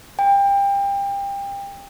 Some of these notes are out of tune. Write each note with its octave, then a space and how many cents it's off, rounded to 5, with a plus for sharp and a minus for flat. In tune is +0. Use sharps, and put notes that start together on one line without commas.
G5 +30